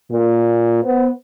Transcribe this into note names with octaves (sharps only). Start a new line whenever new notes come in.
A#2
B3 C5